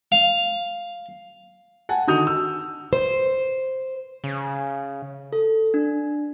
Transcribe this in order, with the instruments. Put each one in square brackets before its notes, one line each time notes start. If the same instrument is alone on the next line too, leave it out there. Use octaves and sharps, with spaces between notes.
[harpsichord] F5
[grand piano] F#5 G#5 A5
D3 D#3 F#4 D#6 G6 F7
E6
[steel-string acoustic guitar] C5
[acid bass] C#3
[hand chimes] A4
D4